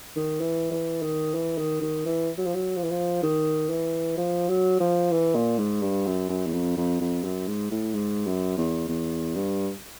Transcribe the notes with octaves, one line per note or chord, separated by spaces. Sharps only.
D#3
E3
E3
D#3
E3
D#3
D#3
E3
F#3
F3
F#3
F3
E3
F3
D#3
E3
F3
F#3
F3
E3
A#2
G#2
G2
F#2
F#2
E2
F2
F2
F2
F#2
G#2
A2
G#2
F#2
E2
E2
G2